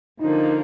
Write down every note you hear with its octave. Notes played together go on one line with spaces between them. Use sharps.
D3 F3 A#3 D#4